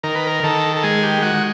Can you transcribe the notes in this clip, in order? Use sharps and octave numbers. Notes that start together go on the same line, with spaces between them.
D#3 A#4
B4
A#4
D#3 A4
A4
G#3 G#4
G4
G#3 F#4